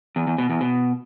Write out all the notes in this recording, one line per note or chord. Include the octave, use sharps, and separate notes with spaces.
E2
E2
B2
E2
B2